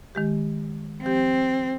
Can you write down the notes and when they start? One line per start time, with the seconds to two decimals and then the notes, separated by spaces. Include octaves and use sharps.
0.15 D#3 G#3 G4
1.02 F3 C4 G4